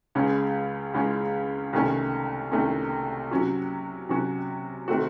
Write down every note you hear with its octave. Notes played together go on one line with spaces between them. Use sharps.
C#2 C#3 G#3 C#4
C#2 C#3 G#3 C#4
C2 C3 D#3 A3 C#4
C2 C3 D#3 A3 C#4
C3 F#3 C#4 F#4
C3 F#3 C#4 F#4
C3 D#3 A3 C4 F#4